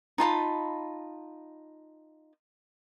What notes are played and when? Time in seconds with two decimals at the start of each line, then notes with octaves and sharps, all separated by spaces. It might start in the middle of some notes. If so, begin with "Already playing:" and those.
0.18 D#4 F4 A5 B5